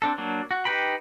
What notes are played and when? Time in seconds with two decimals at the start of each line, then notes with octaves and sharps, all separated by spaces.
0.02 C4 D4 A4
0.18 F#3 A#3 D4
0.51 F#4
0.65 D#4 G4 B4 G5 B5